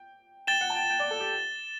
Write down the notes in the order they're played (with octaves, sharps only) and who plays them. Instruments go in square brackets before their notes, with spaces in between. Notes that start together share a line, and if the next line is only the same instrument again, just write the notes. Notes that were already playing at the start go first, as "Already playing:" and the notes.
Already playing: [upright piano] G5
[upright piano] G5 [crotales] A6 E7 G7
[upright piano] F#5
A5
G5
G5
D5
A4
G4